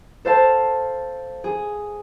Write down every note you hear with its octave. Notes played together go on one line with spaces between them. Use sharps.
A4 C5 F5 A5
G#4